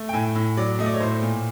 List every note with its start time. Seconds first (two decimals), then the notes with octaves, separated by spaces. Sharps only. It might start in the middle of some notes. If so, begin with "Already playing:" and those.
Already playing: A3
0.09 G5
0.13 A2 G#5
0.35 A2
0.57 F#3 D5
0.79 A3 D#5
0.86 D5
0.94 C#5
1.00 A2 C5
1.22 A#2